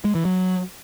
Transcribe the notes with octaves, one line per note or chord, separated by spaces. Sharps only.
G#3
E3
F#3